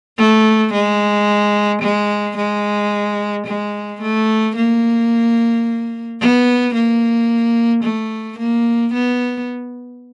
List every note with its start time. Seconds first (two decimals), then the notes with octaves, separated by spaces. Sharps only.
0.18 A3
0.73 G#3
1.82 G#3
2.37 G#3
3.46 G#3
4.01 A3
4.56 A#3
6.20 B3
6.74 A#3
7.83 A3
8.38 A#3
8.93 B3